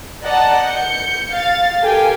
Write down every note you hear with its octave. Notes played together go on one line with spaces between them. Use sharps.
D5 D#5 F#5 A5 A#5
G6 C#7
F5 A6
G4 A4 A#4 F5 G5 G#5